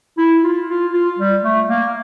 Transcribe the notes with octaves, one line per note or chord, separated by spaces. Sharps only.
E4
F4
F4
F4
G3
A3
A#3